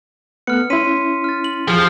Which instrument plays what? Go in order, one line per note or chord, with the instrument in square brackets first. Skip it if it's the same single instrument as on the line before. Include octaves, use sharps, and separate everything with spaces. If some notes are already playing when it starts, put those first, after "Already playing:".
[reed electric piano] A3 B3 F#6 [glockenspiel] F6 C#7
[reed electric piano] C#4 E4 [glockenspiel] C6 B6 D#7
[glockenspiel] F6 A6
F#7
[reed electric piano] E2 G4 G#4 [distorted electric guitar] F3